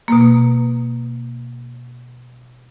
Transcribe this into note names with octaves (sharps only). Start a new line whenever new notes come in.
B2 A#3